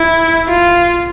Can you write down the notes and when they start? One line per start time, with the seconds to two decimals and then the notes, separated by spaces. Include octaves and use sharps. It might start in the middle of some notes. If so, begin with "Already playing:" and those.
Already playing: E4
0.48 F4